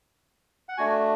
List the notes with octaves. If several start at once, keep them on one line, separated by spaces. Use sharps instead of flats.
F#5
A3 D4 F#4 G#5